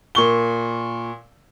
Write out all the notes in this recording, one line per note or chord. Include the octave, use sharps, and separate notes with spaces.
A#2 C#6 G7